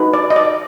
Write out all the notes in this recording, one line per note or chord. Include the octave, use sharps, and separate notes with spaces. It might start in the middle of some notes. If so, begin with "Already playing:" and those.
Already playing: D#4 F#4 B4
D5
D#5
D5